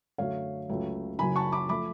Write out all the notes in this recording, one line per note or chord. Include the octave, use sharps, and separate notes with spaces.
F#2 D3 F#3 A3 C#5 F5
C#2 C#3 F#3 A3
F#1 F#2 C#3 F#3 G#5 B5
A5 C#6
B5 D6
F3 A3 B5 D6